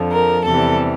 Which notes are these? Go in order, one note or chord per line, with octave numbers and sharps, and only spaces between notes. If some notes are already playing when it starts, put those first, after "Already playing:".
Already playing: F2 D3 F3
A#4
E2 C3 E3 G3 A4